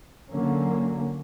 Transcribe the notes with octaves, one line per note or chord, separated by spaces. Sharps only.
D3 F#3 A#3 C#4